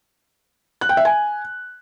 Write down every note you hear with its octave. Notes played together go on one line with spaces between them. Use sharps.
F#6
G5
E5
G#5